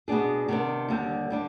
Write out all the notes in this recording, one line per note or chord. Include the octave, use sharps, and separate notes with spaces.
B2 B3 D4 G#4
C3 D#3 B3 D4
D#2 D3 G3
D3 G3 D4